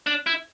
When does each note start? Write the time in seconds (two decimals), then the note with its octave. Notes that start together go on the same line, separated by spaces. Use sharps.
0.07 D4
0.26 E4